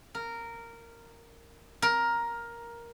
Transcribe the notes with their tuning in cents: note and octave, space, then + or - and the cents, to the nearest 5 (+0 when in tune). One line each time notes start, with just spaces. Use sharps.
A#4 -10
A#4 +10